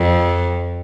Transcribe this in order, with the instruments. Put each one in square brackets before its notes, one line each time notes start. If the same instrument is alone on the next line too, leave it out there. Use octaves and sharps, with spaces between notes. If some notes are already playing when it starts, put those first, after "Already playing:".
Already playing: [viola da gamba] F2